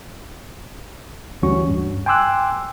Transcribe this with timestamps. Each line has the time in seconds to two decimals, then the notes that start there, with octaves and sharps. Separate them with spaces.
1.42 D2 E3 G3 C#4 F#4 C#6
1.70 G2
2.06 G5 G#5 C6 D6 E6 F#6